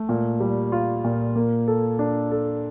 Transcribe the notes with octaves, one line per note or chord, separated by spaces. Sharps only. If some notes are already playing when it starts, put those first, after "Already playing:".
Already playing: A3
A#2
G3
F4
A#2
A#3
A4
D4
A4